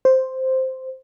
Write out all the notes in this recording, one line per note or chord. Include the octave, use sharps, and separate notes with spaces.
C5